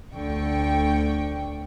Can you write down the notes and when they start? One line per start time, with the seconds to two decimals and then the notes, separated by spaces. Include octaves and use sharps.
0.13 D2 D3 G5 C#6